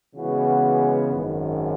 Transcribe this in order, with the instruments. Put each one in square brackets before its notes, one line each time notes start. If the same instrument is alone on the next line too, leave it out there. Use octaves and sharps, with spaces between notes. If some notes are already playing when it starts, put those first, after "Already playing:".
[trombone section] C#3 E3 G#3 B3 F#4
G#1 F#2 D#3